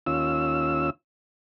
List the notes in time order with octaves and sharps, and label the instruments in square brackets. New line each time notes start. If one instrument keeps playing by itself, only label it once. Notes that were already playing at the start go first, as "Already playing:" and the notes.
[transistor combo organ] D#2 C#4 F4 E6